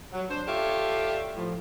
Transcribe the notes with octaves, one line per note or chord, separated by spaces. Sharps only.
F#3
D4 C5
F4 G4 A4 C#5 D5 E5
A2 F3